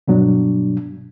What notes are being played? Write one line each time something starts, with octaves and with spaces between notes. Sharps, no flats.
G2 B2 F#3 D4